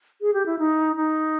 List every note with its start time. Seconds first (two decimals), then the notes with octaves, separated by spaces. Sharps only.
0.21 G#4
0.34 G4
0.46 E4
0.59 D#4
0.96 D#4